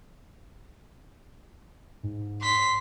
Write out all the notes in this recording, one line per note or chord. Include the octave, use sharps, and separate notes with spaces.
G#2
C6 B6